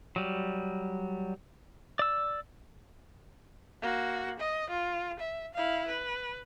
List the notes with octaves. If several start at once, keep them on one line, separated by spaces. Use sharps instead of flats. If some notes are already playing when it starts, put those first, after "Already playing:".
F#3 G3
D5 E6
A#3 F#4
D#5
F4
E5
E4 F5
B4